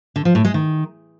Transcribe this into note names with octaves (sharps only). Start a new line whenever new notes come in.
D3
F3
A2
G#3
D#3